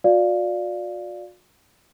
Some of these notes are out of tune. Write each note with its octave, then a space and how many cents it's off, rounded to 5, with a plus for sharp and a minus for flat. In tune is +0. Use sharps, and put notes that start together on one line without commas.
F#4 -45 D5 +0 F5 +0